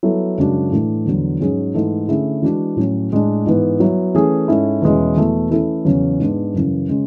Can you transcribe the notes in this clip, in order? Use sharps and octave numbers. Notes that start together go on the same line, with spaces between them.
F#3 B3 E4 A4
F#2 C#3 G#3 D4 F#4
A2 E3 A3 D4
E2 D3 F#3
G#2 F#3 C#4 G#4
G#2 E3 A3 E4 A4
D3 A3 C#4 E4 G#4
E3 G#3 D4 F#4
A2 F#3 C#4
A2 G#3 D4
G#2 E3 B3
F#3 B3 E4
E3 A3 C#4 G#4
G#2 G#3 C#4 E4 A4
E2 B2 G#3 C#4 E4
E2 B2 A3 E4
E3 A3 C#4 E4 A4
E2 C#3 F#3 C#4
G#2 G#3 B3 D4
F#2 C#3 E3
C#3 G#3 C#4